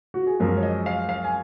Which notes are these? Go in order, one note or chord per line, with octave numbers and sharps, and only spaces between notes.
F#4
G#4
F#2 F3 G#3 A#4
C#5
D#5
F5
F5
G#5